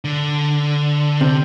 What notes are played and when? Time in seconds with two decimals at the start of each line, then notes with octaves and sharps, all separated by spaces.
0.04 D3
1.21 C3